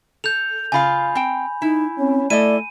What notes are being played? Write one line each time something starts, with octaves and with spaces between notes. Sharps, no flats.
A4 G6 F7
C#3 F4 F5 G#5 B5
C4 G5
D#4 E4
C4 C#4
A3 E4 A4 D5 D#5 D#7